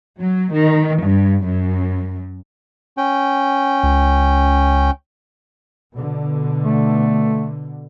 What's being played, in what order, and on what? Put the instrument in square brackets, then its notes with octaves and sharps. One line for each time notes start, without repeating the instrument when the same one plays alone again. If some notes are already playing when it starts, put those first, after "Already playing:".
[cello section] F#3
D#3
G2
F#2
[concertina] C#4 G5
[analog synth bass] C#2
[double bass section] B2 D3
[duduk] A3